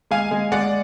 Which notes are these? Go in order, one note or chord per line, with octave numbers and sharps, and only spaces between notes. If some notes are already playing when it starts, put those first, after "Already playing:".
G#3 F5 G#5
G#3
G#3 D5 F#5